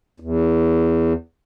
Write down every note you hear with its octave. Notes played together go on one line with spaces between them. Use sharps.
E2